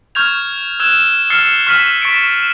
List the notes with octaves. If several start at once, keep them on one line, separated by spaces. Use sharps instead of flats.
C#6 F6 G6 G#6 F7
E6 F#6 G#6 E7
E6 F6 A6 C7 C#7 E7
C#6 F6 B6 D#7 F#7
C#6 A6 B6 C#7 D7